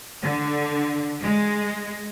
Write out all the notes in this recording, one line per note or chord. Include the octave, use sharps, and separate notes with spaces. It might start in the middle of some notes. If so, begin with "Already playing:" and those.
D3
G#3